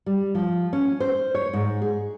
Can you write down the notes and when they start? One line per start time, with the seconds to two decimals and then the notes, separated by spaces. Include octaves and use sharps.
0.06 G3
0.35 F3
0.73 C#4
1.00 C5
1.35 C#5
1.53 G#2
1.82 G#4